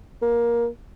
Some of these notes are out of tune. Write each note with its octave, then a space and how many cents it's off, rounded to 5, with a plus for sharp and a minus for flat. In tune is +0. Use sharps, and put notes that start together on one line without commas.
A#3 +15